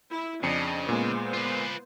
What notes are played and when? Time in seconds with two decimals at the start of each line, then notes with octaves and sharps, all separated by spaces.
0.12 E4
0.43 F2 C#3 D4 D#5 C#7
0.89 A#2 G#3 B3 C5
1.33 F4 B4